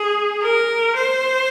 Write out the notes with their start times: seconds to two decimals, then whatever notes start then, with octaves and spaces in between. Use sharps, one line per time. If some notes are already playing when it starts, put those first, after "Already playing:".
Already playing: G#4
0.42 A#4
0.96 C5